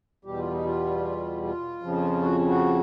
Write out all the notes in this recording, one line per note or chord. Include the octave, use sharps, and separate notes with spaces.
E2 B2 G3 G4
F4
D#4
F4
F4
F2 C#3 F3
F#4
F#4